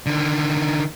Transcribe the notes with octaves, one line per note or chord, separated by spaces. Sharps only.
D3 D#3